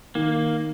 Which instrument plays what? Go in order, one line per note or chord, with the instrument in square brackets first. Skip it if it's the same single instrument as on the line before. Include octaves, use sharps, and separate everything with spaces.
[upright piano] D#3 [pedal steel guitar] A#3